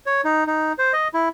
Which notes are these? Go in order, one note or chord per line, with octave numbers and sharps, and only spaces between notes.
C#5
D#4
D#4
C5
D#5
E4